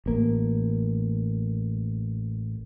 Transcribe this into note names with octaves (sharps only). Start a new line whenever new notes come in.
A1 A#3